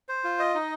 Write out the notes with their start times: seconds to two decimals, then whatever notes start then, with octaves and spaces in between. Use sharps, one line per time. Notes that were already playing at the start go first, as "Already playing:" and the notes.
0.09 C5
0.24 F4
0.39 D#5
0.55 D#4